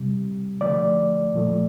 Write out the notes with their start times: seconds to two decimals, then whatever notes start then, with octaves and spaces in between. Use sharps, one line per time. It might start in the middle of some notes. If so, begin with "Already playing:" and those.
Already playing: C3 G3
0.61 D3 F3 A3 D5
1.33 A#2 F3 A3